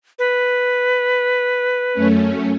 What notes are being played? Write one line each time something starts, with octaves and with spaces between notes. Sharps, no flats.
B4
F#2 A3 C#4